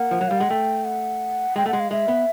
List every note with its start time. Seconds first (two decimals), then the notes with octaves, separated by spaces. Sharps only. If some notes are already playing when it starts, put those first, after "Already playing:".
Already playing: A#3 F#5
0.11 F3
0.21 F#3
0.28 G3 F5
0.39 G#3 F#5
0.50 A3 G5
0.85 F#5
1.56 G#3 G5
1.66 A3 F#5
1.73 G#3
1.80 F5
1.91 G#3 E5
2.08 B3